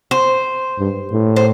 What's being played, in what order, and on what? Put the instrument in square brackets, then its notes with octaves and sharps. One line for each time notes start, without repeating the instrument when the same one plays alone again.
[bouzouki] C5
[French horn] G2
A2
[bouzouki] C5